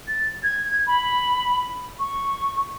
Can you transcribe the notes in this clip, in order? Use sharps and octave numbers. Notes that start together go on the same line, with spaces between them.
A6
G#6
B5
C#6